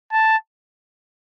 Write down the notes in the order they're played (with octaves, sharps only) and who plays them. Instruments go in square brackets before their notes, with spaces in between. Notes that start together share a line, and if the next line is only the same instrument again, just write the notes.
[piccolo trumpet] A5